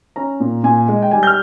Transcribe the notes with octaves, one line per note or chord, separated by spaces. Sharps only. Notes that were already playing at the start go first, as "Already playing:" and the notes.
C#4 A#5
A#2
A#2 G#5
G#3
G5
G3 G#5
G6
F6